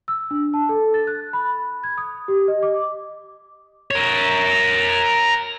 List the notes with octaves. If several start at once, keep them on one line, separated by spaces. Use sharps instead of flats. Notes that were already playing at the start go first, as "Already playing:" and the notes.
E6
D4
A5
A4
A6
F#6
B5
G#6
D#6
G4
D#5
D6
A#4 C#5